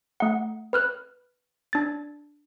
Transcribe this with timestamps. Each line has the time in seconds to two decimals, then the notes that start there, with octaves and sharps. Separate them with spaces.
0.20 A3 F#5
0.73 B4 F6 F#6
1.73 D4 A6